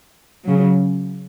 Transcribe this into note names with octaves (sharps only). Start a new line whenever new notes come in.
C#3 F#3